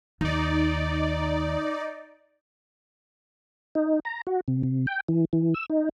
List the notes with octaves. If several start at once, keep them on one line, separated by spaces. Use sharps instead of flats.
D#2 D#4 D5
D#4
A#5
F#4
C3
C3
G5
E3
E3
E6
D#4